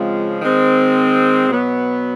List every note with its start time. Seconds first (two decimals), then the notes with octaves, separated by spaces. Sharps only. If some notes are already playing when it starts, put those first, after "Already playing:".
Already playing: C#3 F3 G#3 C4 F4
0.41 D#3 G#3 C4
1.49 B2 F#3 B3